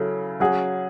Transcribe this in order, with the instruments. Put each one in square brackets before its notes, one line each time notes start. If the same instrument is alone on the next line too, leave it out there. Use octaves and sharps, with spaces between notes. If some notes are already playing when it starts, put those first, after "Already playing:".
Already playing: [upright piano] C#3 F#3 C#4 E4 [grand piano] A4
[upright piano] F#3 C#4 G#4 [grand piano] F#5